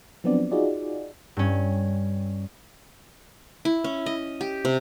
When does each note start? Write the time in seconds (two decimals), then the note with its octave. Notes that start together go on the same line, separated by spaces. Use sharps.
0.24 F3 F#3 B3 C4 D4 D5
0.52 D#4 F4 F#4 G#4 D5
1.37 G2 C#4
3.65 E4
3.84 C#4
4.06 D#5
4.41 G4
4.65 C3